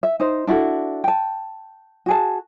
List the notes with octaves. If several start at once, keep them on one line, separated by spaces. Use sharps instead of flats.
E5
D#4 C5
D4 E4 F#4 A4
G5 A5
F#4 G#4 A5